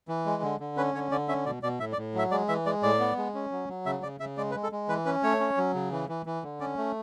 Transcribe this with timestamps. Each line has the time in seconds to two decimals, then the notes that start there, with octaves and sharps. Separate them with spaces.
0.08 E3
0.26 G#3
0.43 D3
0.60 D3
0.77 C#4 B4
0.94 D3 C#5
1.11 D3 D5
1.28 C#4 E5
1.46 B2 D5
1.63 B2 D5
1.80 A2 E5
1.93 D5
1.97 A2
2.14 F#3 E5
2.31 G#3 D5
2.49 E3 E5
2.66 G#3 D5
2.83 A2 D5
3.00 B3
3.17 G#3
3.34 C#4
3.52 F#3
3.69 F#3
3.86 C#3 E5
4.03 C#3 D5
4.20 C#3 E5
4.37 G#3 D5
4.51 B4
4.55 G#3
4.63 A4
4.72 G#3
4.89 E3 B4
5.05 C#4 B4
5.23 A3 C#5
5.40 C#4
5.57 F#3
5.75 C#3
5.92 E3
6.09 E3
6.26 E3
6.43 D3
6.60 C#4 D5
6.77 A3